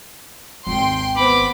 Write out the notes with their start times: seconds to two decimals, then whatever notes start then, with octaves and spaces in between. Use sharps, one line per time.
0.67 G#1 D#2 G5 C6
1.16 B3 C5 B5 D6